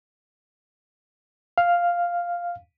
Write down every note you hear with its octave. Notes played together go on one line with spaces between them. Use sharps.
F5